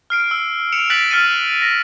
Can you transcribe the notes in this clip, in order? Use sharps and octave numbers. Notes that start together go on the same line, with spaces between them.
F6 C7 D7
E6
C#7 D7 E7 F7
F#6 A6 B6 D7 F#7
F6 A6 C#7 D#7
A#6